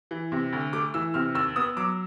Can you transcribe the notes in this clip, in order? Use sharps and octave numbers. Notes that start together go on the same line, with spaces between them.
E3
C3
D2
A3 D6
E3 E6
C3 F6
D#2 E6
B3 D#6
F#3 D6